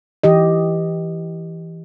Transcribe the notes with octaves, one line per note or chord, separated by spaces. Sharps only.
E3 G4 D#5